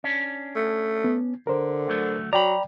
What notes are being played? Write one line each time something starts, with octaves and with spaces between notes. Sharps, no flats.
C#4 D4
A3
B3
D3 A#4 C5
D2 F#3 A3
F#3 D5 G5 A#5 B5